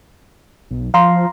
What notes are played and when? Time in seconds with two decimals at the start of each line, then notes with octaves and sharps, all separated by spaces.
0.71 B1
0.94 F3 F5 A#5 C6